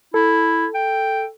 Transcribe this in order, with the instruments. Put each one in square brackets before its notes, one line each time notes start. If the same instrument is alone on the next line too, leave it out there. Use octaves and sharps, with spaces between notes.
[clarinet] E4 [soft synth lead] A4
[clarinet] G5